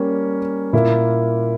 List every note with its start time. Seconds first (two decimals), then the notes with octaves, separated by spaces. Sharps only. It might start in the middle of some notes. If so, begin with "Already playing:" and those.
Already playing: G3 A#3 C#4
0.73 A#2 A#3 E4